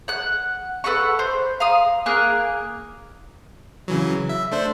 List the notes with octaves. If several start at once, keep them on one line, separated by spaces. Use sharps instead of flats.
F#5 F#6
A4 B4 F#5 C#6
C5
F5 A#5 C6 D#6
A#3 G#4 A#4 F#6
C#3 E3 F#3
E5
A3 D4 C5